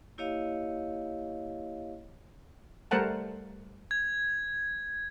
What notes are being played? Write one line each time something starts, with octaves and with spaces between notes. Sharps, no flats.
A#3 E4 G4 C#5 D#5 F5
G3 A3 A#4 C5 F#5 A5
G#6